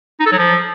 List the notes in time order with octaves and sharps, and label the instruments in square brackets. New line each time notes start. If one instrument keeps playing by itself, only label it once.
[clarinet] D#4
A4
F#3
F3